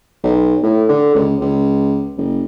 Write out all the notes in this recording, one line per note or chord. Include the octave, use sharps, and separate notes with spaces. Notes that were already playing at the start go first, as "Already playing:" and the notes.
B1
A2
D3
C#2
C#2
F#1